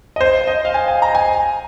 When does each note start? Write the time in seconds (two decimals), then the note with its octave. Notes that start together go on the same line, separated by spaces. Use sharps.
0.16 D#5
0.21 C5
0.47 D#5
0.65 F5
0.74 G#5
0.88 G#5
1.02 A#5
1.15 G#5